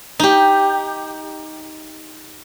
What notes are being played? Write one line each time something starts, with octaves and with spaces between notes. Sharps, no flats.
D#4 G4